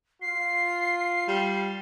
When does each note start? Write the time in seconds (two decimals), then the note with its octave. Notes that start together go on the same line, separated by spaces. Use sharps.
0.22 F4 C7
1.28 G3